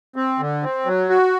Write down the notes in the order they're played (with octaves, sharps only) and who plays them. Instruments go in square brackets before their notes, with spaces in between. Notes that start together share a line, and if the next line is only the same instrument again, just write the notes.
[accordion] C4
D3
C4
F#3
F#4